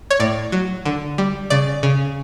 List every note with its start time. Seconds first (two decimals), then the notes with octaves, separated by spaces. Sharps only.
0.10 C#5
0.20 A2 D5
0.52 F#3
0.85 D3
1.18 G3
1.50 C#3 D5
1.83 C#3